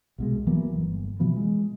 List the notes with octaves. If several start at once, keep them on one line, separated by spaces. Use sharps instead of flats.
C2 B2 G#3
E3 F#3 A#3 B3
G1
B2 E3 F3 B3
G#3